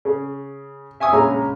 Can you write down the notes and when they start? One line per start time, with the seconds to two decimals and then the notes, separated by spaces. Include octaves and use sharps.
0.05 C#3
1.00 E5 G#5 C#6 D#6 E6
1.13 A#1 C#3 G#3 C#4 A#5